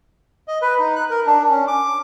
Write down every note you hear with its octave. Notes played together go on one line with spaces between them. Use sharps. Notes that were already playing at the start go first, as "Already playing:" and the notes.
D#5
B4
D#4
F#6
A#4
D4
C#4
D6